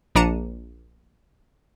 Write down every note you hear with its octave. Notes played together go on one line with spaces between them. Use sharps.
A#1 D4 A#5 C#7 D#7 E7